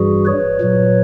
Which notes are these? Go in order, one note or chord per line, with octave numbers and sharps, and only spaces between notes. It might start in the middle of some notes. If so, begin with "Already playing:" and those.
Already playing: G2 E3 G3 F#4 G#4
B4 C#5
A#2 F#3